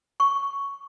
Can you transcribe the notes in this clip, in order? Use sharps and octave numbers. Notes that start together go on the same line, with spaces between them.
C#6